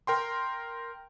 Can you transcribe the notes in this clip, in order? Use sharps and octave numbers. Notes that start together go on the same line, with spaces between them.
A#4 G5 C6